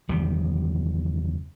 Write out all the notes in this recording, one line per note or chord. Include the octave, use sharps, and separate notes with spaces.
F#1 E2 D#3 G3